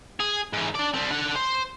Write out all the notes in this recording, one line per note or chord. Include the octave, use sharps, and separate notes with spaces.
G#4
G#2 E3
D4 D5
G3 C4
D4 F#5
C5